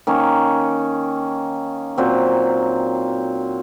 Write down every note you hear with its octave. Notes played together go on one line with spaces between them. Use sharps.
D#3 A#3 C#4
A#2 F#3 C4